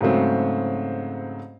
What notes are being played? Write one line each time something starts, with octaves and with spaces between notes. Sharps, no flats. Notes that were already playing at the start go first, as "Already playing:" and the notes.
G#2 C#3 F#3 A3 C4